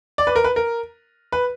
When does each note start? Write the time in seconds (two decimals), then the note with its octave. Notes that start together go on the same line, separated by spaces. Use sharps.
0.18 D5
0.27 B4
0.36 A#4
0.44 B4
0.56 A#4
1.32 B4